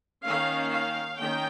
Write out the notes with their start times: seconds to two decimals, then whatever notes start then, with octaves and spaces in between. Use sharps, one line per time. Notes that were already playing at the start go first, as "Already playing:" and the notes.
0.25 D#3 A#3 C#4 F5
0.70 F5
1.16 D#3 A#3 C#4 G5